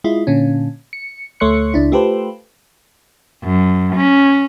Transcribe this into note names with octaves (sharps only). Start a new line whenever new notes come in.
G#3 E4 F4
A#2 D3 C#4
C#7
D2 A3 C#5 C6 F#6 C#7
C#2 D4 E4
A3 F4 G4 A4 B4 C5
F#2
C#4